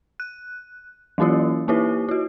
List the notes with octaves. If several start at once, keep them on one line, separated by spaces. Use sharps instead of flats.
F#6
E3 F#3 A#3 C#4 E4 F4
A#3 D#4 E4 G4 B4
E4 F#4